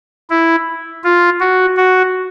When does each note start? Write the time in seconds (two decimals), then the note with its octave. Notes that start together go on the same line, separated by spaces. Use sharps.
0.30 E4
1.04 F4
1.40 F#4
1.77 F#4